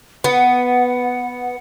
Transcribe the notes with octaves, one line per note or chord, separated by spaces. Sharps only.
B3 F#5